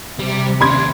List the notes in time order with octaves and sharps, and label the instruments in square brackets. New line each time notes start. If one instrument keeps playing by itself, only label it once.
[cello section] C3 [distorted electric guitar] G3
[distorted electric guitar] D#2 D4 [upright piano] B5 C6 G#6